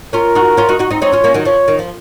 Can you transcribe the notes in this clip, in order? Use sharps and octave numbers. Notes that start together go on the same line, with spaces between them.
C#4 F4 A#4
D#4 F#4
C#4 F4
D#4 F#4
D#4 F#4
C4 D#4
C4 D#4 C#5
C#4 F4
A#3 C#4
D#3 F#3
F3 C#5
D#3
F3